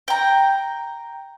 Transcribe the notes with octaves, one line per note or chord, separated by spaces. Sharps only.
G5 A#5